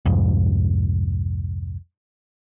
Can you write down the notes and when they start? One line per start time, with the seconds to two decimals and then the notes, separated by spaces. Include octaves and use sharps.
0.05 C2 F2 G#2